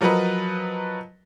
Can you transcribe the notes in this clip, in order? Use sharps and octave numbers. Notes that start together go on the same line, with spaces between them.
F3 F#3 F#4 A#4 B4 D#5